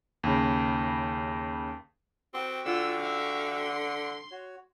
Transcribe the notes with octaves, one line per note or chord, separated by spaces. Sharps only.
D#2 C#3
C4 F#4 G4 C#6
D3 F4 E6
E5 F5
C6
F#4 C#5